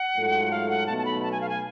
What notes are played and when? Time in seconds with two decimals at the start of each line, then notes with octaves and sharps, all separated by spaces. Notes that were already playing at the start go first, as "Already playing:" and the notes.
Already playing: F#5
0.16 G#2 F#3 A3 F4 A4
0.51 F5
0.69 F#5
0.87 B1 B2 A3 A5
0.98 A5
1.05 B5
1.23 A5
1.32 G#5
1.41 F5
1.49 G#5